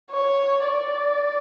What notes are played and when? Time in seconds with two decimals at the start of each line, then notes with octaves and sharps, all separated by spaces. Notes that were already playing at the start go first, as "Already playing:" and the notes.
0.11 C#5
0.65 D5